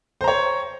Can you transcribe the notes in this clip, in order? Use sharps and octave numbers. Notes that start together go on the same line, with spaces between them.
C5 C#5 A#5